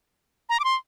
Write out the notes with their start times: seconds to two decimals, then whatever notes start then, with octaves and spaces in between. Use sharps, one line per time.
0.49 A#5
0.60 D6
0.64 C6